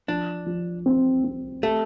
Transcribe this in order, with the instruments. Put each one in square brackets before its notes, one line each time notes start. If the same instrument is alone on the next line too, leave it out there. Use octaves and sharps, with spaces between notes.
[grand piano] F3 [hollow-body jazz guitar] D4
[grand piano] F3
C4
C4
[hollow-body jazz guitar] A3 [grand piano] G4